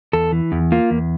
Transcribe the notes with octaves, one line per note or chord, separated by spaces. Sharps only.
E2 A4
E3
E2
A#3 F4
E2